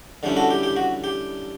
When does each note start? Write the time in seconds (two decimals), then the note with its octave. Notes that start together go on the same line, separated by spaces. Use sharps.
0.23 D3 G3 C#4 E4
0.36 F#4 A4
0.51 G4
0.63 G4
0.76 F#4
1.04 G4